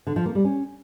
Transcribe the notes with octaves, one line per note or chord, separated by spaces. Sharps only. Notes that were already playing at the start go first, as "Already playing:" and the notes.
D3
F3
A#3
G3
C#4